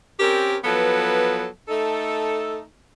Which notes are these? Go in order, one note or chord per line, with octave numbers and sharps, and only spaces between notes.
C4 C#4 G4 A#4
F3 F#3 B3 A4 B4
A3 D#4 A4